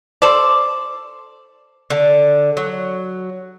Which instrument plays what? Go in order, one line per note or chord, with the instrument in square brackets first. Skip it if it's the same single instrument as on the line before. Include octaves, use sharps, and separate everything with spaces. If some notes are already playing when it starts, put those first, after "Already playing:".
[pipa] A4 C5 D5
[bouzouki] D3
F#3